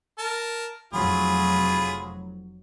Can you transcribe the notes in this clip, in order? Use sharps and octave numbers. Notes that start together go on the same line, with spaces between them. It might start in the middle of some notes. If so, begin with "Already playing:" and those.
A#4 A5
F1 F#3 F4 G#4 B5